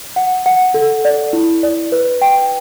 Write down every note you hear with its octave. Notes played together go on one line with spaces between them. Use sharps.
F#5
F#5
A4
D5
E4
D5
B4
G5